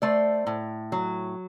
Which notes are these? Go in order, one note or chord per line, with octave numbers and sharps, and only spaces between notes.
A3 C5 D5
A2
F#3